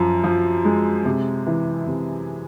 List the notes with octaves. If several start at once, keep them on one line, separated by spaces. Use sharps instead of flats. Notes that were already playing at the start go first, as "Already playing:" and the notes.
Already playing: F#2 F3
F3
G#3
C3
E3
C3